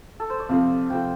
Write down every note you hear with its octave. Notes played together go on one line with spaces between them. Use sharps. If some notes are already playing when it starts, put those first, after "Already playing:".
A4
C5
D5
F2 C3 F3 C4 F5
F2 C3 F3 C4 G5